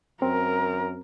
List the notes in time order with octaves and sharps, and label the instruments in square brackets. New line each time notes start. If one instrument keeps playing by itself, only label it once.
[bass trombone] F#2 [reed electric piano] C4 [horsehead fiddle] A#4